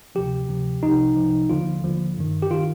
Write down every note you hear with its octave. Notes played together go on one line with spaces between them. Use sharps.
D2 C3 F3 G4
D2 C3 F3
C2 C3 F3 D#4
C2 C3 F3
D#2 D3 F3 F4
D#2 D3 F3
G2 D#3
G4
D#3 F4